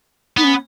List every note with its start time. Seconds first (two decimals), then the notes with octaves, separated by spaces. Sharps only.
0.37 B3 D#4
0.44 C#4